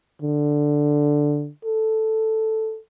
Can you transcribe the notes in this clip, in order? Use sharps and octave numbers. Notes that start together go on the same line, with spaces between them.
D3
A4